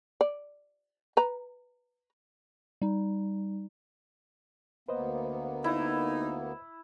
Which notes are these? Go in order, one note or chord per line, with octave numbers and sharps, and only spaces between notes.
D5
B4 A#5
G3 D#4
D2 A#3 B3 B4 C5 D#5
D#4 E4